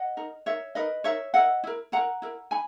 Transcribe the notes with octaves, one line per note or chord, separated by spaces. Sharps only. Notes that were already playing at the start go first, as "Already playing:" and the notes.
Already playing: D#5 F#5
D#4 A#4
D#4 A#4 C#5 E5
D#4 A#4 B4 D#5
D#4 A#4 C#5 E5
E4 A#4 D#5 F#5
E4 A#4
E4 A#4 F#5 A#5
E4 A#4
D#4 G#5 B5